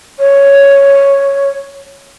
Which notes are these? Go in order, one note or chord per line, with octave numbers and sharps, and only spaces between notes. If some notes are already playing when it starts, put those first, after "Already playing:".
C#5